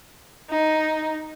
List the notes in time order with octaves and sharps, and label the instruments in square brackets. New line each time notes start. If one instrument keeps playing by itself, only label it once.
[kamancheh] D#4